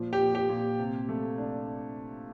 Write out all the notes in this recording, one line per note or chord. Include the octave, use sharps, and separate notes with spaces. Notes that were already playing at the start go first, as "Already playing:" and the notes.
Already playing: A#2 F3
G4
A#2
G4
A#2
C3
A3
D4